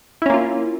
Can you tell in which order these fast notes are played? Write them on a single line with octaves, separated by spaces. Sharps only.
E4 C#4 A#3 F4